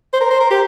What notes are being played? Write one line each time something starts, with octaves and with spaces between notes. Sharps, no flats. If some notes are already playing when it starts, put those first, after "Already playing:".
C5
A#4
C5
A#4
G4